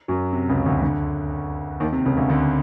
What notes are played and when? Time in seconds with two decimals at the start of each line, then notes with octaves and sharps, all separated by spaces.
0.08 F#2 F#3
0.33 C3
0.49 C#2 C#3
0.66 D2 D3
0.82 D2 D3
1.80 D#2 D#3
1.93 C3
2.06 C#2 C#3
2.17 D2 D3
2.29 D2 D3